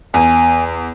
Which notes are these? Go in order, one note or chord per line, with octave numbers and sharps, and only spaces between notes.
E2 G#5